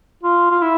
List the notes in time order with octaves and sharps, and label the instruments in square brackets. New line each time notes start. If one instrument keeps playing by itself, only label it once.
[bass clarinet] F4
F4
E4